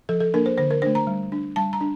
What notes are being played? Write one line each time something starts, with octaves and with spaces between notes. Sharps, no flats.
F3 A4
A4
A#3 D4 A#4
C5
D3 C5
A#4
A3 D4 C5
A#5
G3
D4
G3 A5
A#5
D4